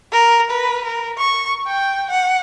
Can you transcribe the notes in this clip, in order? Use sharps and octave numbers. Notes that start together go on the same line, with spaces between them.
A#4
B4
A#4
C#6
G5
F#5